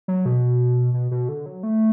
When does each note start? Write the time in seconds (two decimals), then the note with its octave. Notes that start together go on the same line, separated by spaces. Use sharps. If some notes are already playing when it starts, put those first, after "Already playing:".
0.08 F#3
0.26 B2
0.94 B2
1.11 B2
1.29 D3
1.46 F#3
1.63 A3